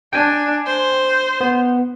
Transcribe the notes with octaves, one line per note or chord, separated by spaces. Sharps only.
D4 G5 G#5
C5
B3